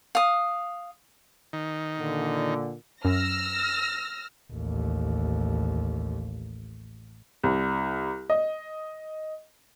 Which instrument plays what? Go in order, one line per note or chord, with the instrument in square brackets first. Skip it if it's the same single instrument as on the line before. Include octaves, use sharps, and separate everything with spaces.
[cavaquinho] F5 D#6
[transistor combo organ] D#3
[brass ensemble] A#2 D3
[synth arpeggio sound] F#2 [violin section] E6 F6 A#6
[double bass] A1 D#2
[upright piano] C2
D#5